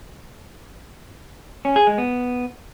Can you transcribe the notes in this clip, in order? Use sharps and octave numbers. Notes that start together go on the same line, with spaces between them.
C#4
G#4
G#3
B3